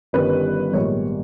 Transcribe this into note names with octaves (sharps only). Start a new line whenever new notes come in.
G1 G2 D#3 G3 C#4 B4
A#1 G#2 D#3 G3 B3 C#5